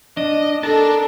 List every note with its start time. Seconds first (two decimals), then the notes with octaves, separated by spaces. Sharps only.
0.17 D4 D#5
0.63 D4 A4 A#4 A5